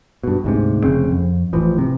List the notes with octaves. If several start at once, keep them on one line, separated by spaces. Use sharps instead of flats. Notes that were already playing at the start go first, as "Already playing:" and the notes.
G2 B2
D2 G#2 C3
F1 C#3 C4
F2
A1 E3 F3
C3